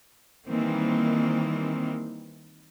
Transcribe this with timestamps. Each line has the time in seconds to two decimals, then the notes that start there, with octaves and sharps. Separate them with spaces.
0.46 D#3 E3 G3 A#3 C4